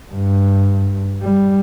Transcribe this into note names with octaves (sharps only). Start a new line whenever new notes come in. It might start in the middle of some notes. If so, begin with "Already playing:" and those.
G2
G3